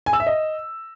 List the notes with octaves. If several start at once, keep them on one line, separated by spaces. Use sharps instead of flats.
G#5
E6
E5
D#5